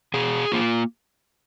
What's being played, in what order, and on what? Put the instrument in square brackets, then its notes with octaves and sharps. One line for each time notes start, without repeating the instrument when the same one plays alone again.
[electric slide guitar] B2 G#4
A#3 F4